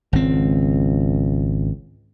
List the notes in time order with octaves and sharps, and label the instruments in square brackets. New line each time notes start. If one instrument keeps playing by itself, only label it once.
[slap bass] G#1 C4 [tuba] C#2